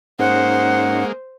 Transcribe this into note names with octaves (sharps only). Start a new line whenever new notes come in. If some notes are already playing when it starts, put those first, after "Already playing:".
G#2 G#3 A#3 C#4 D#4 C5 F#5